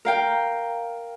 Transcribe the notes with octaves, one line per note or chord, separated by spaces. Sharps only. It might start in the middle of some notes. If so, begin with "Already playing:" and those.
A#4 F5 G5